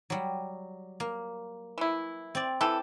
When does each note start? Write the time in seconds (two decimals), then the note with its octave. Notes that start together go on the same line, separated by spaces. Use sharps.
0.10 F#3 G3
1.00 A#3
1.78 E3 E4
2.35 C4 D5
2.61 E3 G4 A4